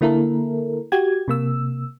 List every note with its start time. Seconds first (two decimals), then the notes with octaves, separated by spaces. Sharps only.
0.01 D3 A#3 E4 A4 A#4
0.92 F#4 G4 G#6
1.28 C3 A#3 E6